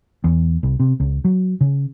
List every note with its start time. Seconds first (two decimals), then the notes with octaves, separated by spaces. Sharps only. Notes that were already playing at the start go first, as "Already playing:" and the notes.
0.24 E2
0.63 C2
0.80 C3
1.00 C#2
1.25 F#3
1.61 C#3